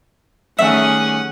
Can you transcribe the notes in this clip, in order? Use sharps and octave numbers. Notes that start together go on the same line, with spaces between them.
D#3 G3 A3 C#4 G#4 E5 F#5